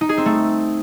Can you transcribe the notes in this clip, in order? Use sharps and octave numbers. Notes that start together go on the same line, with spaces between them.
D#4
G#4
C4
A3